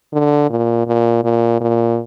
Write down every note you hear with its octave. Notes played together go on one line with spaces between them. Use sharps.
D3
A#2
A#2
A#2
A#2